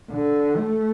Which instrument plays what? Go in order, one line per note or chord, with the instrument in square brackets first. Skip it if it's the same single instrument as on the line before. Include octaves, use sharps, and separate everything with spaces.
[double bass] D3
A3